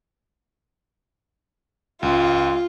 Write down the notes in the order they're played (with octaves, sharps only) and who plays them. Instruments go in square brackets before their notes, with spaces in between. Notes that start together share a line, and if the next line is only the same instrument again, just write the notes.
[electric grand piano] C#2 [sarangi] F4